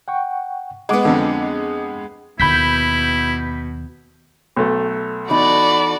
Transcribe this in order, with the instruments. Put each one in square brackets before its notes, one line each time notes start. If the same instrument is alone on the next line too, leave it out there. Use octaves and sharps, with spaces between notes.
[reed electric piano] F#5 G5 C#6
[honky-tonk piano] G#3 B3 [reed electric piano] D#5 F#5 D6
[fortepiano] F2 D3
[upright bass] D#2 D#3 [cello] B2 [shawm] E4 [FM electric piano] B5 G6 B6
[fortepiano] B1 A3
[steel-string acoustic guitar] E2 D#4 A4 [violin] F#4 D5 [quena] B5